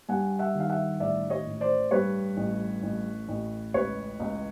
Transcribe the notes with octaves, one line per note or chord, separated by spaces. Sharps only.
G2 F#5 G#5
E5 F#5
D#3
F5
E5 F#5
A1 D5 E5
C#5 D#5
A1
C5 D5
G2 B4 C#5
A1
A1
A1
C#2 B4 C#5
C#2